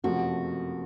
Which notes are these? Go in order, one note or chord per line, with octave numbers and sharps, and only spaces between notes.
F#1 F2 C3 F3 A3 F#4